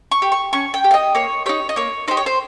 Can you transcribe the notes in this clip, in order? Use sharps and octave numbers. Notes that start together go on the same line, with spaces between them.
C#6
G4
C#6
C#4 C#6
G5
G4
F5
D#5
A#3 C#5
D#4 G4 C#5
D#5
A#3 C#5
D#4 G4 C5
C#5
C5